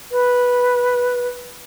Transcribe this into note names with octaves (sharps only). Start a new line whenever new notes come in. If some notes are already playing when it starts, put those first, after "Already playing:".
B4